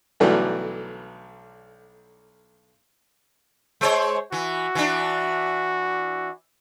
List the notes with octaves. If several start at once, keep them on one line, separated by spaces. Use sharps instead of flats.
B1 D3 E3 F#3 G3 A3
G#3 C5 C#5
E3 F#4
E3 D4